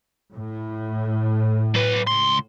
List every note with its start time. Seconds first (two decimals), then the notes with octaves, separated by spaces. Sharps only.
0.33 A2
1.75 F#3 B4
2.07 C#2 C6